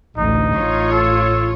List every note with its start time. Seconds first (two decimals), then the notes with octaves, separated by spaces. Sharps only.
0.18 A1 D2 D#4
0.56 A1 F4 C#5
0.92 A4